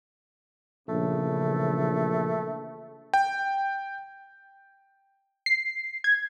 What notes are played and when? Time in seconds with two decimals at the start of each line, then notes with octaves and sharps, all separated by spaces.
0.88 A#1 C#3 E3 A3
3.14 G5
5.46 C7
6.04 G#6